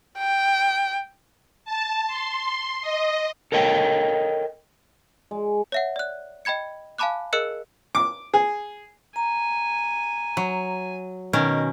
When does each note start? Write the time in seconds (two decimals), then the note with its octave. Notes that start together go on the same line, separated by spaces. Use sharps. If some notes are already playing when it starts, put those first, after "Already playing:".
0.18 G5
1.65 A5
2.07 C6
2.82 D#5
3.52 A4 A#4 C#5 D#5 F#5 G5
5.31 G#3
5.72 C#5 E5 F#5
5.96 D5 F#6
6.45 D#5 G5 B5 G#6 C#7
6.98 F5 G#5 A5 B5 D6 F#6
7.33 G#4 A#4 D#5 E6 F#6 C#7
7.95 D6
8.33 G#4
9.16 G#5 A#5
10.37 F#3
11.33 B2 D#3 C#4 A#4